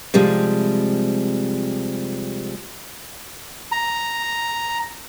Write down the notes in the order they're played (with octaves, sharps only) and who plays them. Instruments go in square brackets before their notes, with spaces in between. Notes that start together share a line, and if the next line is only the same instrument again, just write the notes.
[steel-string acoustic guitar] C3 F3 G3 G#3
[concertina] A#5